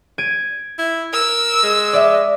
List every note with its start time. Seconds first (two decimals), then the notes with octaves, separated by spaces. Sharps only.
0.18 G#6 D7 D#7
0.78 E4
1.13 A#4 E6
1.63 G#3
1.93 D5 E5